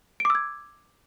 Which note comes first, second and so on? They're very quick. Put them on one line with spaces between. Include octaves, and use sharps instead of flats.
D7 D6 E6 G#6